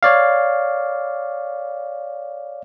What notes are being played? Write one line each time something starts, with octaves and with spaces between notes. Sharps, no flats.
C#5 D5 F5